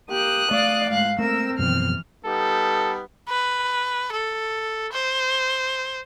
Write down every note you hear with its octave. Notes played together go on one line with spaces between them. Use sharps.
A#3 G4 D#6 F#6
A3 D5 F5
G#2 F5 F#6
A3 A#3 C4 A#4 E6
F#2 B2 E3 F3 F6
G3 B3 D#4 A4
B4
A4
C5